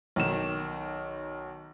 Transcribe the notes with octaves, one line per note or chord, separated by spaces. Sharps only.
B1 D#3 E7